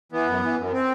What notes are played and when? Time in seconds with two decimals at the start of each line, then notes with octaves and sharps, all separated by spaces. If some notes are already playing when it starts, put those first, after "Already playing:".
0.12 E3 B3
0.27 F#2
0.42 E3
0.57 F#2
0.73 C4